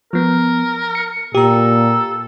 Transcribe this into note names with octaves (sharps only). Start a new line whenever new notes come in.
F3 B3 A#4
C#7
A#2 G4 A4 A#5